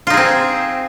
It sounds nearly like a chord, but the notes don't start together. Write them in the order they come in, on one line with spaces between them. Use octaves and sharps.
F4 D#4 G#4 C4